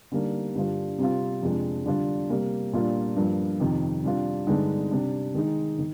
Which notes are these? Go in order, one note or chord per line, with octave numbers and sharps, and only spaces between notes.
D3 G3 A#3 D#4
G2 D3 G3 D4 F4
C3 G3 C4 F4
F2 C3 F3 G#3 D4
D3 G3 D4 F4
C3 G3 A#3
A#2 G3 A#3 D4 F4
G2 F3 A#3
F2 C3 D#3
C3 G3 D4 F4
G2 D3 G#3 D#4
C3 G3 D4
D#3 G#3 D#4
D#3